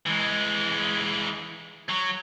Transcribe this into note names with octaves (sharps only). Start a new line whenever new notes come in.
E3 G#3
F#3